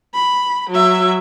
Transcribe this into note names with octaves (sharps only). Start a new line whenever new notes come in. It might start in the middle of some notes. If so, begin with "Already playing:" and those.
B5
F#3 E5